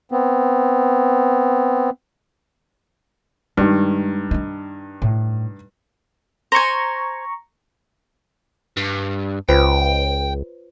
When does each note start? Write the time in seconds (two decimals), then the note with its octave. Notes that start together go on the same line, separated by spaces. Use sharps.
0.12 B3 C4
3.57 G2 D#3 G#3
4.31 D4 D#4
5.02 A2
6.52 C5 G#5 A#5 C#6
8.77 G2
9.49 C#2 F4 B4 C5 G5